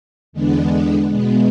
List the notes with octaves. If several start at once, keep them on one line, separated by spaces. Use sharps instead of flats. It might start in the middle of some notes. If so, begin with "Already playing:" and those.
E2 D3 G#3 B3 D4
B2 G#3 B3